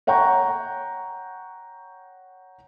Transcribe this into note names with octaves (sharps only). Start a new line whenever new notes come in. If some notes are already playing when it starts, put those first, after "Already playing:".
C#5 F#5 G5 A#5 C#6